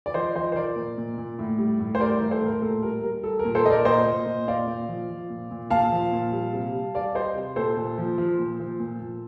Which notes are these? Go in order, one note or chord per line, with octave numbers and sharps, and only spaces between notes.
D5
F3 C5 D#5
F3 C5 D#5
C5
F3 A#4 D5
A#2
A#2
A#2
A2
G3
A2
C5
G3 A#4 D5
A2
A4 C5
A2 A#4
A#2 A4
G3 A#4
G3 A#4
G3 A4
A#4
A#2
A4 C5
A#2 A#4 D5 D#5
A#2 C5 D#5
A#2
A#2
A#2 D5 F5
A#2
F3
F3
A#2
A#2
A#2 F5 A5
F3
A#2
G3
C3
G3
G3 D5 F5
G3 C5 D#5
C3
A#2 A4 C5
A#2
F3
F3
A#2
F3
A#2
A#2